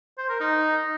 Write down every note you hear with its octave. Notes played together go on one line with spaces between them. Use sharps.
C5
A#4
D#4